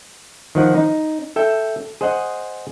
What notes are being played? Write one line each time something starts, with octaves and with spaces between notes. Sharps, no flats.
D#3 F3 F#5
D#4
A4 E5 G5
G#4 C5 D#5 F#5